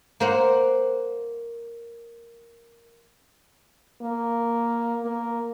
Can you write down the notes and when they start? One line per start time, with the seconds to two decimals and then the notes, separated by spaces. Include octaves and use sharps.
0.20 A#3 C5 F#5
4.02 A#3
5.03 A#3